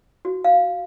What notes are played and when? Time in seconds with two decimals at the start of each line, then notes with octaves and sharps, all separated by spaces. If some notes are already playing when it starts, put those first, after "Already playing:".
0.25 F#4
0.44 F5